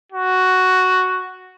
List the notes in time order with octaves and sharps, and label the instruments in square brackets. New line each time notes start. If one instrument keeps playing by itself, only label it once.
[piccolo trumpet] F#4